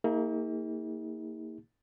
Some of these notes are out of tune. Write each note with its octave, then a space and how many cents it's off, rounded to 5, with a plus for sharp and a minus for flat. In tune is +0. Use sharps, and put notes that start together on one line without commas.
A#3 -25 D#4 +45 G4 +45